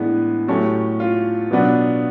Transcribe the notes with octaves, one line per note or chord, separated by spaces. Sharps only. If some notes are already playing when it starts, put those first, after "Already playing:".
Already playing: A2 E3 G#3 B3 D4 G#4
A2 F#3 A3 C#4 G4
F4
B2 F#3 B3 D4